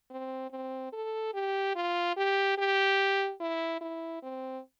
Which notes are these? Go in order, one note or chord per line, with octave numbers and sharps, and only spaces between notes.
C4
C4
A4
G4
F4
G4
G4
E4
E4
C4